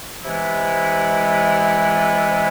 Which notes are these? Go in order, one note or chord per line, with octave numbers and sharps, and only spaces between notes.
C3 E3 G#3 B3 E4